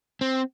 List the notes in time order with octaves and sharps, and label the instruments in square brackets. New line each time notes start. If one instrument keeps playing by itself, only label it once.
[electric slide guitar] C4